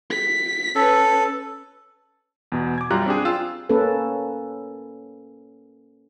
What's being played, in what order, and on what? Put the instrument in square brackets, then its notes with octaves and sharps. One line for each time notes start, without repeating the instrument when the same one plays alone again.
[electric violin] B6
[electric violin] C#4 B4 [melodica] A4
[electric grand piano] E2 B2
D6 G#6
F#2 G3 F4 G4 A#5 F#6
C4 D4 G4 G#4
F4 G5 E6
[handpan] A#3 C#4 A4 B4